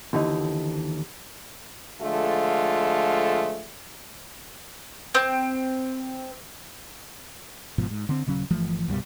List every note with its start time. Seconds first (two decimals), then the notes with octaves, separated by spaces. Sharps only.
0.13 D#2 D3 E3 D#4
2.01 D3 F3 G#3 A3 F4
5.15 C4
7.78 G#1 G#2 B2 F3
7.90 G#2
8.09 D3 C4
8.26 D#1 C#3 F#3 C#4
8.50 G1 E3 F3 A3
8.88 C2 G2 B2 G3